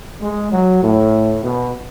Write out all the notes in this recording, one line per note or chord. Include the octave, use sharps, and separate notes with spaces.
G#3
F#3
A2
B2